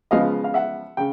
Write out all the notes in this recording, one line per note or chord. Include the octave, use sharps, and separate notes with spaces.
C#3 F3 G#3 B3 D#5 F5
F5
E5 F#5
C#3 G5